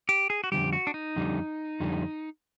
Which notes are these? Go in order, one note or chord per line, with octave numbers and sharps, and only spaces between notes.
G4
G#4
F#4
F2 D3 G3 G4
F#4
D4
D#4
F2 D3 G3
F2 D3 G3